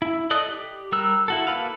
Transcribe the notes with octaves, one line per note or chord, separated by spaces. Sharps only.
E4
A4 D5 D#5 D#6 F#6
G4
G3 A#4 E6 F#6
E4 F#4 A4
A#3 A4 B4 F5